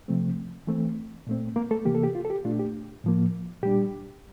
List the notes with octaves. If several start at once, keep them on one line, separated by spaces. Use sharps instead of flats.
C3 F3 A3 C4
E3 A3 C4
A#2 A3 C4
A#3 A#4
A3 A4
C3 E3 A#3 G4
A4
G4
F4
A4
G4
A#2 A3 D4 F4
G4
A2 F3 A#3
A#2 G3 D4 G4